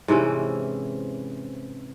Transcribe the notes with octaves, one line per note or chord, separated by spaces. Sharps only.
G#2 C3 E3 C#4